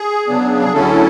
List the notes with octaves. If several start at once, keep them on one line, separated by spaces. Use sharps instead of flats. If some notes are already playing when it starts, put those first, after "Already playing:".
Already playing: G#4
C#3 F#3 B3 D4
G#4
D2 D3 F#3 C#4 E4 A4